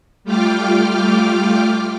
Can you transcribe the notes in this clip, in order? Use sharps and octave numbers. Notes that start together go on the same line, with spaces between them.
G3 A3 F4 G5 D6 F6